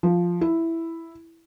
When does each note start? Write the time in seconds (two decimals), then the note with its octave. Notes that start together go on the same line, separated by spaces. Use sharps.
0.03 F3
0.41 E4